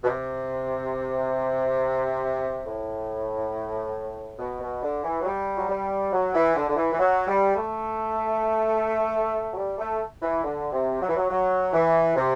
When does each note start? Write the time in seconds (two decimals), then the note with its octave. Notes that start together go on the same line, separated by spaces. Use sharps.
0.03 B2
0.07 C3
2.66 A2
4.39 B2
4.61 B2
4.82 D3
5.04 E3
5.21 F#3
5.25 G3
5.57 F#3
5.68 G3
6.12 F#3
6.33 E3
6.55 D3
6.68 D3
6.76 E3
6.92 E3
6.98 F#3
7.27 G3
7.55 A3
9.52 F#3
9.57 G3
9.78 A3
10.22 E3
10.43 D3
10.72 C3
11.01 F#3
11.08 E3
11.16 F#3
11.30 F#3
11.73 E3
12.16 C3